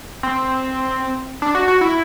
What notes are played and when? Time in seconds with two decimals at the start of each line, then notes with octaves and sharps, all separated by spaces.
0.23 C4
1.42 D4
1.55 F#4
1.68 F#4
1.81 E4